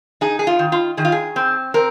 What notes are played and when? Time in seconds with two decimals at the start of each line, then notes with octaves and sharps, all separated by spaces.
0.21 D#4 G#4
0.39 G#4
0.47 F4
0.59 D#3
0.72 F4
0.97 D#3 G#4
1.05 F4
1.12 G#4
1.36 C4
1.74 C4 A#4